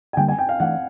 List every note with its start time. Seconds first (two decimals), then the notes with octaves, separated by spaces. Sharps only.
0.13 G#5
0.17 D3 G3 A#3 G5
0.28 G#5
0.39 G5
0.49 F5
0.60 E3 A3 D4 F#5